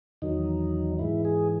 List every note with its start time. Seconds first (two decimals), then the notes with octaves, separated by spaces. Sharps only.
0.22 E2 D#3 F#3 D#4
0.99 G#2 E3 G#3 E4
1.25 G#4